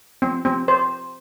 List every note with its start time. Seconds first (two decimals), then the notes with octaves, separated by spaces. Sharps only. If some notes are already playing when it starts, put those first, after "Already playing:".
0.22 C4
0.45 C4
0.68 C5